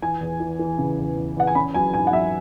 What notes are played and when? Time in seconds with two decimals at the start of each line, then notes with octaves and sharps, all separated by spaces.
0.02 E3 G#5
0.21 E2
0.40 E3
0.59 E3
0.78 C#3
0.99 E2
1.17 E2
1.37 E2 F#5
1.47 G#5
1.55 C#4 B5
1.74 F#3 G#5
1.94 G#2 G#5
2.07 F#5
2.13 F#3 E5